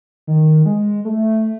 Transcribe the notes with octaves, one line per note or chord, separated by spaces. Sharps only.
D#3
G#3
A3